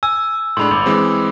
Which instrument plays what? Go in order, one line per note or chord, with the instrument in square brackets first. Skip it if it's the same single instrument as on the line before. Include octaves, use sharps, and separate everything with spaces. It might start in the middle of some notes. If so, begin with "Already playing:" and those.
[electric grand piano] G#5 [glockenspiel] E6
[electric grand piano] A2 G#3 D4 [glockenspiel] B5 C6
[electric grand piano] G1 [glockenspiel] D6 F7
[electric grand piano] E3 G#3 C4